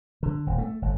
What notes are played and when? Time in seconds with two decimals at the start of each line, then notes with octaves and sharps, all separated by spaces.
0.23 D3
0.47 D#1
0.58 A3
0.82 G1